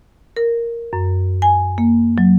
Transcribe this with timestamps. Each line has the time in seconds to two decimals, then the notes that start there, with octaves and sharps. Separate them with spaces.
0.37 A#4
0.93 F#2
1.42 G#5
1.78 A#3
2.18 F#3